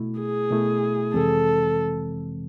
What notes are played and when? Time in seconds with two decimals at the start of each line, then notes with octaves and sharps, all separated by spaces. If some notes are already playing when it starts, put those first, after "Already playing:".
Already playing: B2 A3 E4
0.20 G#4
0.51 B2 A3 E4
1.14 F2 C3 E3 G#3 C4 A4